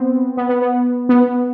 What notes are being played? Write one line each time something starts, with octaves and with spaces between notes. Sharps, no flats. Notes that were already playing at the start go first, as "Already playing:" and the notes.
Already playing: B3 C4
B3
B3
B3
B3